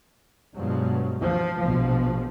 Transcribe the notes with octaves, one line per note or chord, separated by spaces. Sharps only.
G2 B2 F3 F#3 G#3
F3
A#1 B2 F3